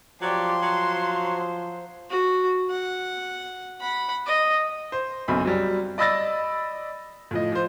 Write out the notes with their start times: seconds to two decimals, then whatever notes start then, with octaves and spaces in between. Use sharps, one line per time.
0.22 F3 F#3 G4 D5 C6
0.62 F#3 C5
2.10 F#4
2.70 F#5
3.80 F#5 B5
4.27 D#5
4.92 C5
5.28 B1 F#2 C4 B5
5.45 F#3 G3
5.98 D5 D#5 B5 E6 A6 A#6
7.31 A2 F3 D#5
7.52 F3 C5